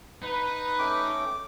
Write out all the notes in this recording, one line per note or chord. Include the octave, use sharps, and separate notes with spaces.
D#4 B4
A3 C#4 G5 D6